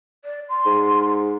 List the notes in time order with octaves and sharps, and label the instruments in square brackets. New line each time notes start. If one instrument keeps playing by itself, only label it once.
[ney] D5
C6
[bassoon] G#2